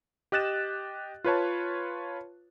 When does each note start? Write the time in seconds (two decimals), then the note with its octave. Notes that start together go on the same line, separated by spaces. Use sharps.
0.32 G4 D#5 F#6 A6 E7
1.24 F4 B4 C#5 A5